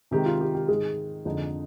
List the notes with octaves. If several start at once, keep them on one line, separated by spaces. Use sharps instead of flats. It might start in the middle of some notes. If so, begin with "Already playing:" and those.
C3 D#3 G#3 G4
F4
G4
G4
G#2 D#3 G#3 G#4
F2 D3 G#3 D#4